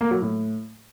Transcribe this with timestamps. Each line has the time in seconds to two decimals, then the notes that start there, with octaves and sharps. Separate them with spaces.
0.01 A#3
0.11 F#3
0.21 A2